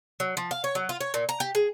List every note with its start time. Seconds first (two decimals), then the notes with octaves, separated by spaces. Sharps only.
0.20 F#3
0.37 F3
0.51 F5
0.64 C#5
0.75 F#3
0.89 F4
1.01 C#5
1.14 A#2
1.29 A#5
1.40 G4
1.55 G#4